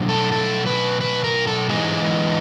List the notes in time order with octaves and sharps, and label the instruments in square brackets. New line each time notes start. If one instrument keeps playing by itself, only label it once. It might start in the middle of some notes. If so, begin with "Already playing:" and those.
Already playing: [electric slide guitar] B2 F#3 A3 D4
A4
A4
B4
B4
A#4
A4
E3 G#3 B3 D#4 G#4